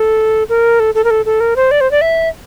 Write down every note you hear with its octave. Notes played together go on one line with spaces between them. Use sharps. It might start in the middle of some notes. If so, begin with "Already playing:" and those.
Already playing: A4
A#4
A4
A4
A#4
A4
A4
A#4
C5
D5
C5
D5
E5